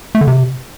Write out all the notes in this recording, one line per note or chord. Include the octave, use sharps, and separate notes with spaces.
A3
D3
C3